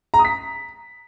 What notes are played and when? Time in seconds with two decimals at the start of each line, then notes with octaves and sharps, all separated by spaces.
0.14 A#5
0.19 D#6
0.25 B6